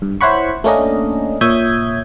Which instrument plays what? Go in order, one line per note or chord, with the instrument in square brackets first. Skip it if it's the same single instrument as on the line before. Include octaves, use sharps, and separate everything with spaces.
[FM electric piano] G2
E4 C5 C#5 F#5 B5 C#6
A3 A#3 C#4 D4 A#4 D#5
A#2 C#5 E5 D#6 G6 G#6